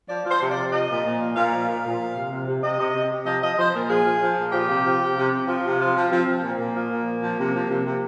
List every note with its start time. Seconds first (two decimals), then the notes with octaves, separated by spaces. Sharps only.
0.09 F3 D5
0.25 F3 C5
0.41 C3
0.51 D5
0.57 C3
0.72 F3 D#5
0.88 A#2
1.04 A#2
1.20 F3
1.36 A#2 F5
1.52 F3
1.68 A#2
1.84 A#2
2.00 F3
2.15 C3
2.31 C3
2.47 C3
2.63 C3 D#5
2.78 C3
2.95 C3
3.11 C3
3.26 F3 D#5
3.42 F3 D#5
3.58 F3 C5
3.74 A#2 A#4
3.89 F3 G#4
4.05 F3
4.21 F3
4.38 A#2
4.52 F3 G4
4.69 C3
4.85 F3
5.00 C3
5.17 C3
5.32 C3
5.48 F3
5.64 C3
5.79 F3 F4
5.96 F3
6.11 F3 C4
6.27 F3
6.43 A#2 A#3
6.59 A#2
6.74 F3
6.91 A#2
7.06 F3
7.23 F3
7.39 C3
7.54 F3
7.69 C3
7.85 C3